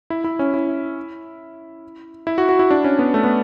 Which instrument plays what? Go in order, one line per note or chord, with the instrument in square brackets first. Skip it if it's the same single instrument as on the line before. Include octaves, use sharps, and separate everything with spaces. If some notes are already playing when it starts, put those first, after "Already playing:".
[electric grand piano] E4
E4
C#4
E4
E4
F#4
F#4
E4
D4
C#4
B3
A3
B3